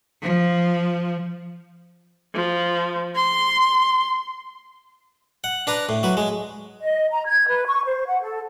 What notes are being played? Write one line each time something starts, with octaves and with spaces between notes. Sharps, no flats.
F3
F3
C6
F#5
D4 B4 A#5
A2
F#3 B4
G#3
D#5
A#5
G#6
B4
C#6
C5
F#5
A4